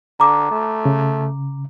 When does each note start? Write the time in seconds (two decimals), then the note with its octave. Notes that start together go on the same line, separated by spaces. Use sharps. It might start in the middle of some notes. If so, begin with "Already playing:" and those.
0.20 D3 A#5 D6
0.51 A3
0.85 C#3